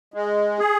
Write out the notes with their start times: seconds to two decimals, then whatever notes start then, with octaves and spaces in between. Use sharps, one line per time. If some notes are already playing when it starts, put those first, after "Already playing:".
0.14 G#3
0.59 G#4